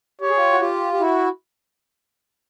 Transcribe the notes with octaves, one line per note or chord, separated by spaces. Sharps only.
G4 C#5
G#4
F4 G4
F#4
F4 G4
G4
E4 F#4